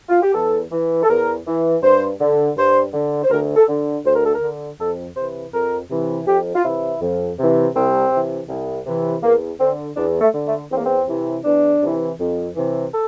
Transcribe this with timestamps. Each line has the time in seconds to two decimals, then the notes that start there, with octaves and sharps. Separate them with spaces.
0.09 F4
0.22 G4
0.34 E2 A4
0.71 E3
1.03 A4
1.09 E2 A#4
1.46 E3
1.82 G2 C5
2.20 D3
2.57 G2 C5
2.94 D3
3.23 C5
3.30 D2 A#4
3.56 A4
3.68 D3
4.05 D2 C5
4.15 A#4
4.24 A4
4.35 A#4
4.42 D3
4.79 F2 A4
5.16 C3 E3 C5
5.53 F2 A#4
5.90 C3 E3
6.26 F2 G4
6.55 F4
6.63 C3 E3 E4
7.00 F2
7.38 C3 E3
7.74 C2 C4
8.11 C3 E3
8.49 C2
8.86 C3 E3
9.22 E2 A#3
9.59 D3 C4
9.96 E2 D4
10.21 A3
10.33 D3
10.47 A3
10.71 E2 C4
10.77 A#3
10.85 C4
11.08 C3 E3
11.44 E2 D4
11.82 C3 E3
12.19 F2
12.55 C3 E3
12.92 A4